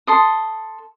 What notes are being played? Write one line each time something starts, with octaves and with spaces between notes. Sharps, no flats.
A4 C6 D#6